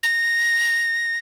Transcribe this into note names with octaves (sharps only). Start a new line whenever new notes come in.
A#6